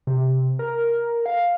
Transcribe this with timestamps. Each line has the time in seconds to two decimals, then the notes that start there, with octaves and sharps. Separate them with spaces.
0.07 C3
0.59 A#4
1.26 F5